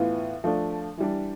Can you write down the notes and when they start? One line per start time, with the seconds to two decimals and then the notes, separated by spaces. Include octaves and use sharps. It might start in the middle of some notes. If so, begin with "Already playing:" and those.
Already playing: A2 E3 B3 F4
0.44 F3 A3 D4
0.98 E3 G3 D4